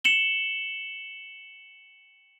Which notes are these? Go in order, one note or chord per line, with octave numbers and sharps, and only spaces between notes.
C#7 E7 F#7 G7